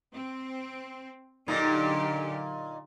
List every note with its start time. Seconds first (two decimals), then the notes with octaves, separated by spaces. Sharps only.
0.14 C4
1.48 A#2 D3 F#3 D#4 G4